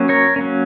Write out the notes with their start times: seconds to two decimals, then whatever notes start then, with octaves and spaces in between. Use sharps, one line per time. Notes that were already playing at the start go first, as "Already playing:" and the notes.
Already playing: F#3 A#3 C#4
0.09 A#4 C#5
0.36 F#3 A#3 C#4